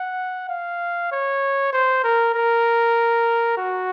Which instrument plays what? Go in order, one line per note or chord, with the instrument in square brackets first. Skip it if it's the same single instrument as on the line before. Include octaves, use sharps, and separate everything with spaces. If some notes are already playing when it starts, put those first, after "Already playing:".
Already playing: [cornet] F#5
F5
C#5
C5
A#4
A#4
F#4